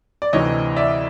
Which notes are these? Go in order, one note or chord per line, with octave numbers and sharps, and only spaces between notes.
D5
D2 C3 E3 C#5 D#5
D5 E5